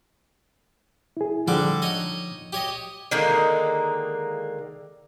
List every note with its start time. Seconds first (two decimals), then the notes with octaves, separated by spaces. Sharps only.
1.17 E4 G#4
1.48 D3 F3 G3 D6
1.82 D#4 C#5 D#5
2.53 G4 C#5 D#5
3.11 D3 D#3 G#3 A#3